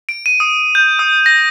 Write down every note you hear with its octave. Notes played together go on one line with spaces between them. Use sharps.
D7
D#7
D#6
G6
D#6
A#6